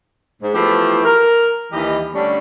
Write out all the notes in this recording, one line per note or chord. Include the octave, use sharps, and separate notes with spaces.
G#2
E3 F3 A3 B3 E4 G4
A#4
D#2 E3 G3 G4 D#5
D3 G3 A3 C#4 D4